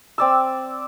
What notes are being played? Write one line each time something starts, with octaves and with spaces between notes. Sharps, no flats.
C4 D5 E6